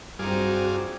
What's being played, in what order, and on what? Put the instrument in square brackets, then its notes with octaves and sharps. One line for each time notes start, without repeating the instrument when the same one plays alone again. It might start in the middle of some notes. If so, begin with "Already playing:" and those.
[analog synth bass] G2 [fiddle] C4 D#4 [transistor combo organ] F4 G#4 D5 [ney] F#4